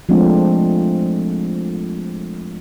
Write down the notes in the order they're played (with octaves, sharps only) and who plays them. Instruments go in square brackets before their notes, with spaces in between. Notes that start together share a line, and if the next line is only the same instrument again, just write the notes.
[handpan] F3 G#3 A3 C4 D4 F4